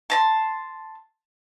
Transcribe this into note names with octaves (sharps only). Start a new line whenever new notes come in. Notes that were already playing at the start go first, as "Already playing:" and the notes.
A5 A#5 C6